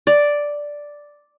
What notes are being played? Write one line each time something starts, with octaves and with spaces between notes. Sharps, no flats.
D5